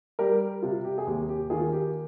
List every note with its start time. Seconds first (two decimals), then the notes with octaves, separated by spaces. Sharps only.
0.19 G3 G4 A#4
0.62 C3 F4
0.84 G4
0.98 G#4
1.07 D#2 G4
1.29 G4
1.50 D#3 F4 G#4
1.72 G4